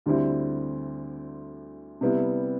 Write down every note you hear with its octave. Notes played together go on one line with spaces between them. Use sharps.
D2 D3 G3 C4 E4
C3 G3 B3 E4